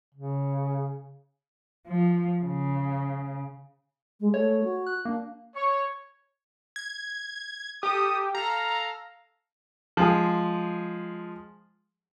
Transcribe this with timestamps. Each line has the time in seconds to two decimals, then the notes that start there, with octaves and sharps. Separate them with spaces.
0.14 C#3
1.88 F3
2.45 C#3
4.20 G#3
4.34 A3 C#5
4.63 F#4
4.87 F#6
5.05 A#3 D4
5.55 C#5
6.76 G#6
7.83 G4 A4 D#6
8.35 A4 F5 A#5
9.97 F3 G#3 G#4